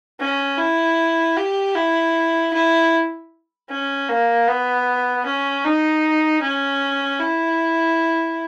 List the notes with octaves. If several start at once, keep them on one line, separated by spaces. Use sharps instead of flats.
C#4
E4
G4
E4
E4
C#4
A#3
B3
C#4
D#4
C#4
E4